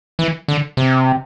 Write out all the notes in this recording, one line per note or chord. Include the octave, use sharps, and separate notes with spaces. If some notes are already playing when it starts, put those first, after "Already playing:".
E3
D3
C3